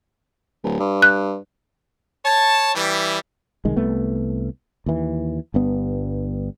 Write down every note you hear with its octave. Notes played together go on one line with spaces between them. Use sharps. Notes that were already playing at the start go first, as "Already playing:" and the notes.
D1
G2
F#6
C#5 A5
E3 G3
C2 D#3 G#3
C2 A3 B3
D#2 E3
G1 G2 B3